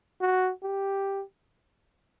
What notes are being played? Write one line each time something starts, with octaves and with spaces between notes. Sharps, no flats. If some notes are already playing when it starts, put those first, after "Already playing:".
F#4
G4